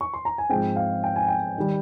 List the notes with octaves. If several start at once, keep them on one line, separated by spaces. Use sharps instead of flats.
C#6
C6
A#5
G#5
G#2 F3 G#3 C4 G5
F5
G5
G#5
G5
D#3 G3